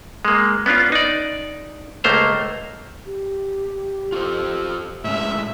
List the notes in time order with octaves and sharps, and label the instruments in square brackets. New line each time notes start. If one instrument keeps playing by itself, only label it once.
[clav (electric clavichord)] G#3 A#3
B3 C#4 D4 F4
D#4 D5
C#2 A3 A#3 C5 A#5
[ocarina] G4
[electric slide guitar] F4 A4 C5
[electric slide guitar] A2 G#3 C#4 [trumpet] E5